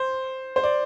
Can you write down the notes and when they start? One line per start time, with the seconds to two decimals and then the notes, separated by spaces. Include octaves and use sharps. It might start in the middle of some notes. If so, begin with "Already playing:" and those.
Already playing: C5
0.56 C5
0.63 D5